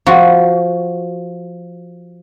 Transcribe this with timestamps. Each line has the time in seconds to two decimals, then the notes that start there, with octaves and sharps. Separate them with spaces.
0.06 F3 F#4